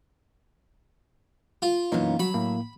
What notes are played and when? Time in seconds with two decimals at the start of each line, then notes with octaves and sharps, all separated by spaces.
1.62 F4
1.92 F#2 B2 E3 A#3 C#4 D#4
2.19 F#3 F#4 B5
2.34 A2 A#3